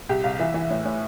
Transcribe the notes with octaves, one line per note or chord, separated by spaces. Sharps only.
C2 G4
C2 F5
E3 E5
E3
A2
A2